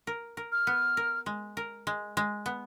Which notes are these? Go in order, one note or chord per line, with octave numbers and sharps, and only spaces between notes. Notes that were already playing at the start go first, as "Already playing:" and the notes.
A#4
A#4
F6
B3
A#4
G#3
A#4
G#3
G#3
B3